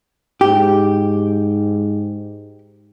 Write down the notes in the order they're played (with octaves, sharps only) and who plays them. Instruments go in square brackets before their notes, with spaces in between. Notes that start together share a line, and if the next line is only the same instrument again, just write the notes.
[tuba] G#2 [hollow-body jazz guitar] G4